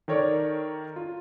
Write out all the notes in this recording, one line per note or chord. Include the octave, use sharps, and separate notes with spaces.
D#3 A4 A#4 C#5 D5
F4